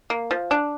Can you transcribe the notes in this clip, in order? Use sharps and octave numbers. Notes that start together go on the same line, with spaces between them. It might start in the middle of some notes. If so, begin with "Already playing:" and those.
A#3
F3
D4